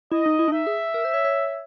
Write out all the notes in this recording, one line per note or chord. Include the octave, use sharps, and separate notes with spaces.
E4 D#5
D#4
E4
D4
D#4 E5
G#4
A#4
C5
C#5
C#5